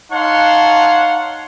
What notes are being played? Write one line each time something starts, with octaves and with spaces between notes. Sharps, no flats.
D#4 C#5 F5 F#5 A5 C6